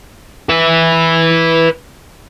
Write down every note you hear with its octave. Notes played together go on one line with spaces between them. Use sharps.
B4 E5